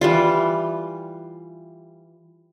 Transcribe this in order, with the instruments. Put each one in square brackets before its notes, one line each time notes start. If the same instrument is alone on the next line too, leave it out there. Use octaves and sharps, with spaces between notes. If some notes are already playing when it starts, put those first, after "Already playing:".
[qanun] E3 G3 F4